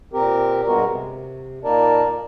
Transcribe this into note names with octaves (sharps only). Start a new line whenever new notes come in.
A#2 C4 G4 A#4
G2 B2 G#3 B3 F#4 A#4
C3
A#2 A#3 D#4 A#4 D5 A5